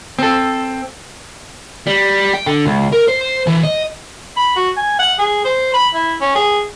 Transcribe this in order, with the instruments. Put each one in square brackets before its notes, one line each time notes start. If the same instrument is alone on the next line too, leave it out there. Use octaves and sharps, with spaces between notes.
[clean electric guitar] C4 A4
[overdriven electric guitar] G3
G5
D3
C#2
A#4
C5
E3
D#5
[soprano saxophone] B5
F#4
G#5
F#5
G#4
C5
B5
E4
C#4
G#4